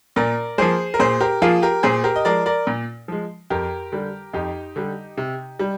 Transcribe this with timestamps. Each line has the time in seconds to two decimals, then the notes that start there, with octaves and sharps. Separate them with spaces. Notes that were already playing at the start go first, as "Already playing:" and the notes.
0.16 A#2 A#4 D5
0.58 F3 A#3 G#4 C5
0.94 A#4
1.00 A#2 G#4 C5
1.20 G4 A#4
1.42 F3 A#3 F4 G#4
1.62 G4 A#4
1.83 A#2 G#4 C5
2.04 G4 A#4
2.16 D#5
2.25 F3 G#3 A#4 D5
2.46 A#4 D5
2.67 A#2
3.08 F3 G#3
3.50 F2 G4 A#4
3.92 D3 G3
4.33 F2 D#4 G4
4.76 D3 G3
5.17 C3
5.59 G3